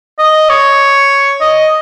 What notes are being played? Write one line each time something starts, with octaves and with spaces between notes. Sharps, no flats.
D#5
C#5
D#5